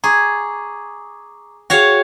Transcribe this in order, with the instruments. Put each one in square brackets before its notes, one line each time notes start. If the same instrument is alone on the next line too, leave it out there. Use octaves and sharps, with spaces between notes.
[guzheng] G#4 [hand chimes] A#5 C#6 D6
[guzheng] F#4 C#5 F5 [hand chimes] G#4 G5